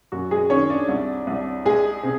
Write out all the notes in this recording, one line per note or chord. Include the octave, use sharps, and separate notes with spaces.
F#2 F#4
G#3 G#4
D#3 C#4 C#5
D4 D5
C2
C2
G#3 G#4
C3